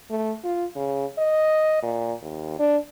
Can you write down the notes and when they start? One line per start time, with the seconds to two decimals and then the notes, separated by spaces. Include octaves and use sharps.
0.10 A3
0.44 F4
0.76 C#3
1.18 D#5
1.83 A#2
2.22 D#2
2.59 D4